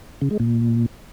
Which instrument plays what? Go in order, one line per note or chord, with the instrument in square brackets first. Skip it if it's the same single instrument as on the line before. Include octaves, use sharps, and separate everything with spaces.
[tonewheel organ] C#3
G#3
A#2